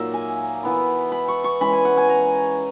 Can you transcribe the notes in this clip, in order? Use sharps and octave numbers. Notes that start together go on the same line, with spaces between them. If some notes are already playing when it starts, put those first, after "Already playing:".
Already playing: A#2 F#3 A#3 D#4 E5
G#5
E3 B3 E4
B5
C#6
C#6
E3 G#3 C#4 B5
G#5
F#5
G#5
A#5